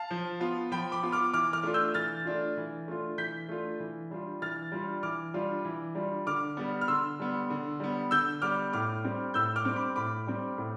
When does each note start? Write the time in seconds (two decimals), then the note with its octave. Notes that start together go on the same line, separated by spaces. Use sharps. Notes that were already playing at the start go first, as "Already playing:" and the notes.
Already playing: F5 A5
0.11 F3
0.40 B3 F4
0.71 F3 G5 B5
0.92 B5 D6
1.03 B3 F4
1.12 D6 F6
1.33 E3 D6 F6
1.53 D6 F6
1.63 A3 D4 F4
1.74 E6 G6
1.94 E3 F6 A6
2.25 A3 D4 F4
2.57 E3
2.88 A3 D4 F4
3.18 E3 G6 B6
3.49 A3 D4 F4
3.80 E3
4.11 G3 D4 F4
4.42 E3 F6 A6
4.72 G3 D4 F4
5.03 E3 D6 F6
5.34 G3 D4 F4
5.65 E3
5.95 G3 D4 F4
6.27 D3 D6 F6
6.57 G3 B3
6.81 F6
6.88 D3 C6 E6
7.20 G3 B3
7.50 D3
7.80 G3 B3
8.11 D3 E6 G6
8.42 G3 B3 D6 F6
8.73 A2 D6 F6
9.04 G3 C4
9.34 A2 E6 G6
9.56 D6 F6
9.65 G3 C4
9.76 B5 D6
9.96 A2 B5 D6
10.27 G3 C4
10.58 A2